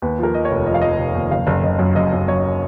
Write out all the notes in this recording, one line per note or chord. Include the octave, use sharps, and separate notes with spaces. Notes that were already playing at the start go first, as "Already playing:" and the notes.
D#2 B4
F3 A#4
F3 D#5
C#5
F1
F3 D#5
F5
F3 D#5
F1
D#2
F#1 F5
F#1
F#1 D#5
F#2
F#1 D#5
F#2
F#2 C#5